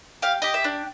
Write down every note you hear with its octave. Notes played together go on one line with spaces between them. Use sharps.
G4 F5
G4 D#5
E5
D4